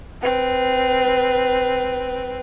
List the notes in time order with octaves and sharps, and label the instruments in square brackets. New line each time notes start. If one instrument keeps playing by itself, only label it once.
[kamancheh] C4 B4